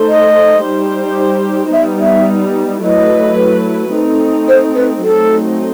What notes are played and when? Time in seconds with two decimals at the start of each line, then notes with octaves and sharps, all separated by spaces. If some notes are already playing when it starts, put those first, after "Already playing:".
Already playing: A3 D#4 A4 C5
0.08 D#5
0.63 G3 D#4 G4 C5
1.72 G3 B3 D#4 E5
2.00 E5
2.82 F#3 A3 E4 B4 D#5
3.92 A3 C4 D#4
4.48 C5
4.75 B4
5.02 F#3 A3 C4 D#4 A4